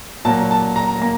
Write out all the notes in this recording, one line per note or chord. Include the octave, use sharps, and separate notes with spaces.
A#2 F#3 A#3 A5
A5
A#5
A#3 A#5